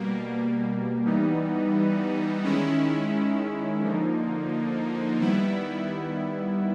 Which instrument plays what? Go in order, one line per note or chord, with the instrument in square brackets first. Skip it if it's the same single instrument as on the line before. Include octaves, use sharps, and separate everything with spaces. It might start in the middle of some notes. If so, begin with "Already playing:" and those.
Already playing: [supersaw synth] B2 G3 A#3
E3 G3 B3 D#4
D#3 G#3 C#4 E4
D3 F3 A#3 D#4
D#3 G3 B3 E4